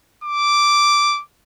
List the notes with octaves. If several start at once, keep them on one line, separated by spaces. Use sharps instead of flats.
D6